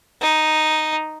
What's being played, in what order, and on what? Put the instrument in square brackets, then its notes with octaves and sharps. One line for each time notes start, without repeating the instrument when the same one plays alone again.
[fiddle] D#4